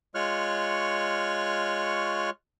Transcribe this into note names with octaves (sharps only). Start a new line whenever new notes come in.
G#3 F4 C#5 C#6 F6 F#6